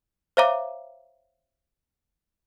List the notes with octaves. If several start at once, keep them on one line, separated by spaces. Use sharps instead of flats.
C5 C#5 E5 F5 A#5 D6